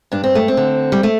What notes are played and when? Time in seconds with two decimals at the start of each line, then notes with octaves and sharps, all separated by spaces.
0.12 G2 D4
0.24 C4
0.35 A3
0.48 C4
0.57 D3
0.92 G3
1.03 A3